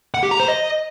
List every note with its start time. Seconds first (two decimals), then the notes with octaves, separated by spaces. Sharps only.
0.14 F#5
0.23 G4
0.31 A#5
0.40 C5
0.48 D#5